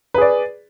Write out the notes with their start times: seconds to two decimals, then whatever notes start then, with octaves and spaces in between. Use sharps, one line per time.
0.14 B4
0.18 G#4
0.21 D5